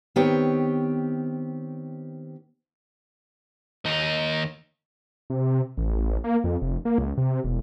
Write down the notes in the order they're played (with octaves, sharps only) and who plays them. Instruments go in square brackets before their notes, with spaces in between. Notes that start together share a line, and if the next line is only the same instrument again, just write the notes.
[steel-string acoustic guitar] D#3 B3 C4 G4 C#5
[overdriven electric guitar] D#2 D#4
[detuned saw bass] C3
A1
A#3
F2
F1
A#3
C#2
C3
E1